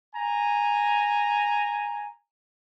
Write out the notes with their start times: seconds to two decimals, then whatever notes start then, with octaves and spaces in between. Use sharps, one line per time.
0.15 G#5 A#5